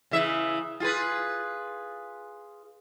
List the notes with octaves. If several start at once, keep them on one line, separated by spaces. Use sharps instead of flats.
C#3 E3 E5
F4 G#4 B4